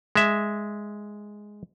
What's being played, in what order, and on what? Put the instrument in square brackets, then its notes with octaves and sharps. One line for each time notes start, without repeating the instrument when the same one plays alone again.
[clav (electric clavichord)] G#3 E5